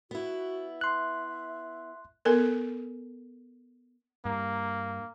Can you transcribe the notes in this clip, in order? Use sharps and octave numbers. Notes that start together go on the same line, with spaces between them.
B3 E4 F#4
E5 C6 F#6
B3 A4 A#4
G2 A#3